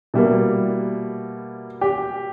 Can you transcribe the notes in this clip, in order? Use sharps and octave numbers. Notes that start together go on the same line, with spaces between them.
B2 G3 A#3 E4
G4